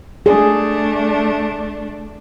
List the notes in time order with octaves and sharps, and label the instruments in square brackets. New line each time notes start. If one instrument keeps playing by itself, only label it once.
[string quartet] A3 D4 [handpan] G#4